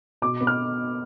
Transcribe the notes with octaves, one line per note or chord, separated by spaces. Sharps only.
B2 D6
B3
F6